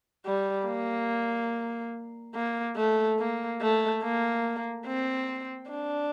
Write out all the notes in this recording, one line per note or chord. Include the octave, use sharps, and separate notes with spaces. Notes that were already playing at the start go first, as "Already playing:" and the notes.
G3
A#3
A#3
A3
A#3
A3
A#3
C4
D4